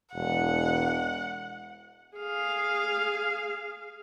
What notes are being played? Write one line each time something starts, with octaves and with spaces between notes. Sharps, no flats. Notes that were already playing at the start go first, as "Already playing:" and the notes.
E1 F#5
G#4 F5